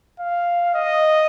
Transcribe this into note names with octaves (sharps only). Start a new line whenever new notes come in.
F5
D#5